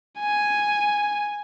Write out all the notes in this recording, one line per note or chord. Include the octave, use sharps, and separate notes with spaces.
G#5